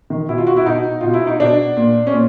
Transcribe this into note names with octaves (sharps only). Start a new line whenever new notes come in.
D#3
B2 E4
F4
F#4
E4
B2 D#4
B2 F4
E4
D#4
B2 D4
A#2
C#4
A#2